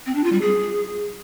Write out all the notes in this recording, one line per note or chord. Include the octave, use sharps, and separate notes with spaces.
C4
D4
F4
G3
G#4